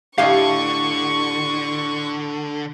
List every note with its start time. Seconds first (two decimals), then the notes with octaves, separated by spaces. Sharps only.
0.18 A2 D3 G4 D#5 F5 C#6